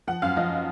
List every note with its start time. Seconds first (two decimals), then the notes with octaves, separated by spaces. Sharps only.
0.07 F3 F#5
0.22 F#2 F5
0.37 F3 D#5